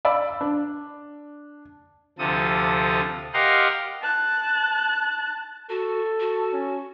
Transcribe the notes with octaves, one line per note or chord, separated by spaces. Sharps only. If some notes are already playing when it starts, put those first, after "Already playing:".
D5 F5 B5 E6
D4
D2 C3 F3 A4 D#6
G4 A#4 D#5 F5 F#5 C6
A5 F#6
F#4 A4
F#4
C#4